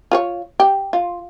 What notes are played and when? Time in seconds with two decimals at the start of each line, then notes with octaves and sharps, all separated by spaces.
0.12 F4 C5 C#5
0.60 G4
0.93 F4